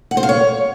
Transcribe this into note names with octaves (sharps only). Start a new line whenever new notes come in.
F#5
C5
F5
C#5